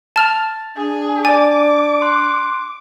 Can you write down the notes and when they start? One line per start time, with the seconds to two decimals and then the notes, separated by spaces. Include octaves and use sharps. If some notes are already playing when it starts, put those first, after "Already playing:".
0.16 A5 F6 A6 F7
0.76 D4 G#4
1.25 D5 G#5 D6 A6
2.02 C6 F#6